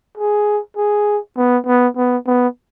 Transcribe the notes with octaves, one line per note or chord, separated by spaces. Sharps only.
G#4
G#4
B3
B3
B3
B3